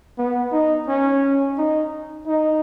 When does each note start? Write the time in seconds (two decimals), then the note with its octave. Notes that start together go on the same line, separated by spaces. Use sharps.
0.18 B3
0.53 D#4
0.88 C#4
1.58 D#4
2.27 D#4